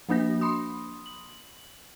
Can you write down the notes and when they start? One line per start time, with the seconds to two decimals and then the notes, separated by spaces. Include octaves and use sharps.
0.09 F3 A#3 D4 F#4 A#6
0.41 B5 C6 D#6
1.06 F#7